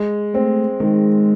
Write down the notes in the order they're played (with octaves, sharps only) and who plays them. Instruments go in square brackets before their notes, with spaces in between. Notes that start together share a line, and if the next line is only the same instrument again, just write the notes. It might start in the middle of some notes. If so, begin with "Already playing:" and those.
Already playing: [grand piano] G#3
[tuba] A3 [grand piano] C4
[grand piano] D#3 [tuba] G#3